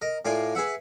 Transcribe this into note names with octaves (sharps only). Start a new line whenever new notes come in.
A#4 D#5
A2 F4 A#4 D5 G#5 C6
G#4 B4 E5 F#5